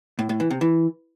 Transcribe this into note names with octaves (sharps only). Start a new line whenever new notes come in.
A2
A2
E3
C3
E3